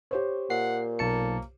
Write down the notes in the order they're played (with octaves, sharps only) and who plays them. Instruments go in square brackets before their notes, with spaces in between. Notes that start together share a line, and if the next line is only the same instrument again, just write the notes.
[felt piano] G4 C5 C#5
[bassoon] A#2 [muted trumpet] F#5 [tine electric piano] C7
[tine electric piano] B1 A5 C#7 [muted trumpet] A#3